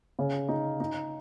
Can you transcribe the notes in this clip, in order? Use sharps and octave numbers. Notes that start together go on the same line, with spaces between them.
C#3
D#4
D#4